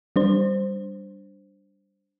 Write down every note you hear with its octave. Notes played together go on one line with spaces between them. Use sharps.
G3 D4 C5